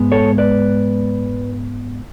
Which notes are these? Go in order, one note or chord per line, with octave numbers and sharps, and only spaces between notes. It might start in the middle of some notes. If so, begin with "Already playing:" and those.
Already playing: G#2 G#3 B3
A4 C#5
B4 D5